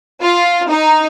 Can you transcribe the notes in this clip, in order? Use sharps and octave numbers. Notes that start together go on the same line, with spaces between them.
F4
D#4